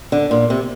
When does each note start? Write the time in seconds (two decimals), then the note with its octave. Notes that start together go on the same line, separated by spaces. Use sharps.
0.12 D3
0.31 A#2
0.50 C3